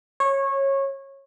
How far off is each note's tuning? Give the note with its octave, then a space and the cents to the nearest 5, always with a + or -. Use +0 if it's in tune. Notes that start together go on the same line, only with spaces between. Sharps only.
C#5 -20